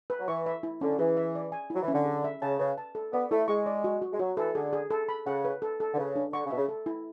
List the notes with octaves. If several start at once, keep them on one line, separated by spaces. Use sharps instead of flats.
B4
F#3
E3 C#6
E5
E4
D3 C#4
E3 G#4
E5
D5
G#5
F#3 E4
E3
C#4
D3
G#4
E5
C#3 A5
C#3 B4
A5
A4
B3 D5
A3 E4
G#3 C#6
D5
F#4
F#4
G#3
F#3 F#4
E3 A4
D3 G#4
G#4
A4
B5
C#3 F#5
B4
A4
A4
D3
C#3 B4
D4
D3 C#6
C#3
B2 E5
C#3
A4
E4